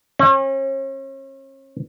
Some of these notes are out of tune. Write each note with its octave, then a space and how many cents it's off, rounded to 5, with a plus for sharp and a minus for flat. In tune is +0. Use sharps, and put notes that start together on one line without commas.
C#4 -40